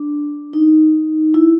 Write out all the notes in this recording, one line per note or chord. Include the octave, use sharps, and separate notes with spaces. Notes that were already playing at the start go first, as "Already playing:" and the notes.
Already playing: D4
D#4
E4